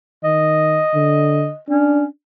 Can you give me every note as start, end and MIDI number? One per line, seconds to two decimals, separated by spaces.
0.24 0.81 51
0.24 1.59 75
0.94 1.50 50
1.69 2.06 61
1.69 2.04 62